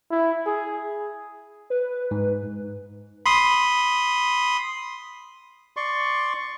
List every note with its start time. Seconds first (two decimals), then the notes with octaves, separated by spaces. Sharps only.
0.11 E4
0.46 G#4
1.70 B4
2.11 G#2
3.26 B5 C6 D#6
5.77 D5 C6 C#6